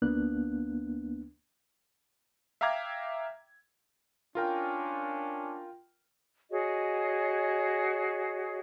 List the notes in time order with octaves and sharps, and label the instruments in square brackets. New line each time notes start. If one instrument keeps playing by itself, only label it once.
[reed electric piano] D2 A#3 B3 D4 F#6
[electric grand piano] E5 F5 G5 A#5 D6 G#6
[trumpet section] C#4 D4 [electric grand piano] F4 A#4 G5
[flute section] F#4 G#4 C#5 D#5